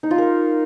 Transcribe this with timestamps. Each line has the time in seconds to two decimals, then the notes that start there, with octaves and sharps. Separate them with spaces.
0.03 D#4
0.11 F4
0.18 A#4